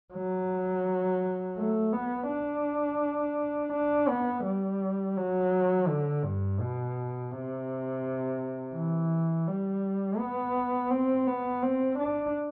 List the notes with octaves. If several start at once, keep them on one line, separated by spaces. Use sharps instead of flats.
F#3
A3
B3
D4
D4
B3
G3
F#3
D3
G2
B2
C3
E3
G3
B3
C4
B3
C4
D4